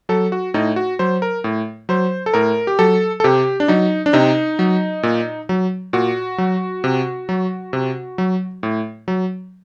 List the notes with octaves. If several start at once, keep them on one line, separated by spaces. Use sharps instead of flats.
F#3 A4
F#4
A2 D#4
F#4
F#3 C5
A#4
A2
F#3 C5
A4
A2 A#4
G4
F#3 A4
A4
C3 G4
D4
F#3 D#4
D4
C3 D#4
F#3
A#2
F#3
A#2 F#4
F#3
C3
F#3
C3
F#3
A2
F#3